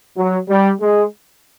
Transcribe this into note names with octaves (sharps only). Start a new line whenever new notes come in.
F#3
G3
G#3